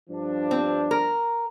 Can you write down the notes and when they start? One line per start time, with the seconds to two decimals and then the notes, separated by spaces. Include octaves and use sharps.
0.10 G2 F3 D4
0.51 C4
0.91 A#4